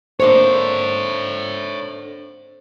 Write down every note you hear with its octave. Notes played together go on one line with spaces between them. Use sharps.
D3 A#3 D4 C5 C#5 E5